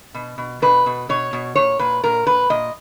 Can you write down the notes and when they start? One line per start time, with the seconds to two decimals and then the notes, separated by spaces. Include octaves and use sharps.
0.14 B2
0.38 B2
0.62 B2 B4
0.86 B2
1.09 B2 C#5
1.33 B2
1.56 A#2 C#5
1.79 A#2 B4
2.04 A#2 A#4
2.27 A#2 B4
2.50 A#2 D#5